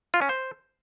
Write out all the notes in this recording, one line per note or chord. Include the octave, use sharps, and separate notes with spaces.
F4
C#4
C5